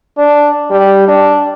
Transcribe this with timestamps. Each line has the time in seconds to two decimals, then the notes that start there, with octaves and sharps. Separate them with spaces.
0.18 D4
0.71 G3
1.08 D4